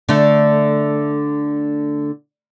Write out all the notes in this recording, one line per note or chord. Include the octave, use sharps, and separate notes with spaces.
D3 A3